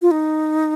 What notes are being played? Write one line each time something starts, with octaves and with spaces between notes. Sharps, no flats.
F4
D#4